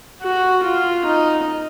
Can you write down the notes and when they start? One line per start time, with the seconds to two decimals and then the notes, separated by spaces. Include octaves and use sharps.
0.22 F#4
0.64 F4
1.06 D#4